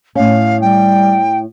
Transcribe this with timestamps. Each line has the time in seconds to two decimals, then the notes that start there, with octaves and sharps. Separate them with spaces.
0.15 A2 C#4 F5
0.61 G3 G5